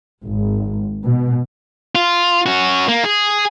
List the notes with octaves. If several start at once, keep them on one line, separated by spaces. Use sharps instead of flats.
G#1
B2
F4
C#4 F#4
A#3
G#4